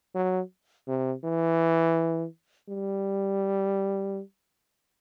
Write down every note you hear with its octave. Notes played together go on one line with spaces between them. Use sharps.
F#3
C3
E3
G3